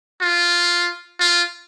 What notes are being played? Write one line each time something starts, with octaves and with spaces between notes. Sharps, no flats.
F4
F4